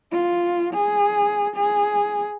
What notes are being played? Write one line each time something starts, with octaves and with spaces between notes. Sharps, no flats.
F4
G#4
G#4